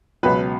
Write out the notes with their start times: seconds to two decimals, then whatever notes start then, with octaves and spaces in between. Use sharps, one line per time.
0.23 C#2 B2 F#3 B4